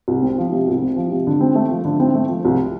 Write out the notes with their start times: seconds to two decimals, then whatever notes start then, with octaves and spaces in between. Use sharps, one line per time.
0.08 C2
0.23 C4
0.38 F3
0.52 C3
0.68 C2
0.82 C4
0.97 F3
1.12 C3
1.27 D3
1.41 C4
1.55 A3
1.71 F3
1.85 D3
2.00 C4
2.15 A3
2.29 F3
2.45 C2